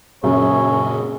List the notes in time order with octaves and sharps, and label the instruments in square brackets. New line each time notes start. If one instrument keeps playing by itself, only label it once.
[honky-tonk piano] F#2 [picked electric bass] A#2 C#3 [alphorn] G#4 [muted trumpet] C#5